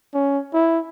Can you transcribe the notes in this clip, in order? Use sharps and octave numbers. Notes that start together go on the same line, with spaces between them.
C#4
E4